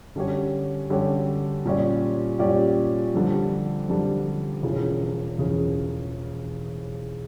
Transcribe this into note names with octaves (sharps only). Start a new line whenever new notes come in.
D3 G3 C#4 G4 C#5
D3 G3 C#4 G4 C#5
A#2 G3 C#4 G4 D5
A#2 G3 C#4 G4 D5
F2 D3 G3 D4
F2 D3 G3 D4
E1 E2 C#3 F3
E1 E2 C#3 F3